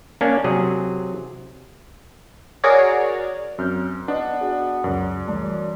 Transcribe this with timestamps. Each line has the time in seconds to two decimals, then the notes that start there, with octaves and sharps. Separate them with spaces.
0.21 A#3 C#4 D4
0.44 C3 F#3 G#4
2.64 F#4 G#4 A#4 C#5 D5
3.58 F#2 C4 F6 G6
4.08 B3 D4 D#5
4.41 F#4 G#4 D5
4.84 F#1 C#2 F#2
5.28 E3 G3 A3 D4